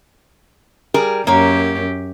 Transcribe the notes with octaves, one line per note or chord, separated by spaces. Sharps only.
G3 G#4 A#4
F#2 A#3 G4 C#5